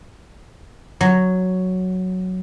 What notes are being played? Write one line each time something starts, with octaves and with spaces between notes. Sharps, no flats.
F#3